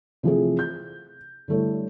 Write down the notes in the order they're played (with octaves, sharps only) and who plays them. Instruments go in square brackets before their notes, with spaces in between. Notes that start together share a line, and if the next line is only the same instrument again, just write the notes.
[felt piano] C3 E3 F3 A3 F4 G#4
G6
D3 G3 A3 E4 C#5